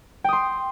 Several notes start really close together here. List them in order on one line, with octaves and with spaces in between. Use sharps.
G5 D#6 C6